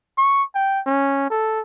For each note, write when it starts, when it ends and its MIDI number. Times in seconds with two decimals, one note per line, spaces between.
0.18 0.43 85
0.55 0.80 79
0.87 1.28 61
1.30 1.61 69